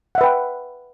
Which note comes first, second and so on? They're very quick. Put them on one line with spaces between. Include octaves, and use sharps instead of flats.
F#5 E5 B4 G5